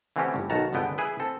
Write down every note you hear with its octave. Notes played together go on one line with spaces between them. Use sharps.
D3 E3 A3 C4 C#4 G4
G1 G2
B1 D#3 F#4 A5 A#5
G1 C#2 D3 B3 G5
E4 G#4 B4
C4 A4